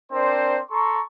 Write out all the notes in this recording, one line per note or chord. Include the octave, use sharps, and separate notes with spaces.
C4 D4 A#4 C5 D5 C6
A4 A#5 C6 C#6